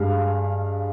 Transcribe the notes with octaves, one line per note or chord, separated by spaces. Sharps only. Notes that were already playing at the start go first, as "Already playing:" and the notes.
Already playing: G2 G#3 F5